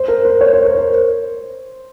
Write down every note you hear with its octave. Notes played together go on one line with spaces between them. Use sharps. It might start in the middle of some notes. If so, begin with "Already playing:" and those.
Already playing: C5
A#4
C5
C#5
C5
A#4
C5